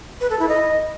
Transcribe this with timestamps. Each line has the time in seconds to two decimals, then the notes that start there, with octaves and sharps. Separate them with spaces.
0.21 B4
0.30 A4
0.39 E4
0.48 D#5